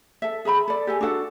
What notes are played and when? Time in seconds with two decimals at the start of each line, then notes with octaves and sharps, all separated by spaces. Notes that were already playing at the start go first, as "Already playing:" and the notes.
0.22 A4 E5
0.45 G#4 E5 A#5 B5
0.68 A4 D5
0.87 G4 A4 G#5
1.01 D4 F#4 A4 F#5